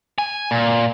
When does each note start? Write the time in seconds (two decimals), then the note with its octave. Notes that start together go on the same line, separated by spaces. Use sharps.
0.18 G#5
0.51 A#2